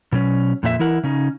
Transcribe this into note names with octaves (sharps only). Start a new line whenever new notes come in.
B2 F#3 C#4
F2 A#2 D4 E5
E3 E4 A#4 F#5
C#3 C#4 D#4